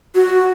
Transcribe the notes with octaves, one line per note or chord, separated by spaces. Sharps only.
F#4